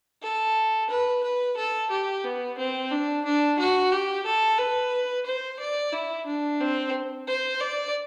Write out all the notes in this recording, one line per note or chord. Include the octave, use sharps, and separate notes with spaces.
A4
B4
B4
A4
G4
B3
C4
D4
D4
F#4
G4
A4
B4
C5
D5
E4
D4
C4
C5
D5